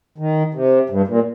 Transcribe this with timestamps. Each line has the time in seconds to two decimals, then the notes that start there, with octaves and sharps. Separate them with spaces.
0.18 D#3
0.54 C3
0.90 G2
1.07 A#2